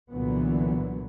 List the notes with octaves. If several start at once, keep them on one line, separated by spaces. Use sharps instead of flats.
C2 A#2 D3 E3 F#3 B3